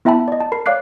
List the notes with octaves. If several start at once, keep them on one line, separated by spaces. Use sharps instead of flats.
B3 E4 E5 G5 A5 B5
D5 D#5
A5
A#4 B5 C7
C#5 D5 F5 D6 F#6 C7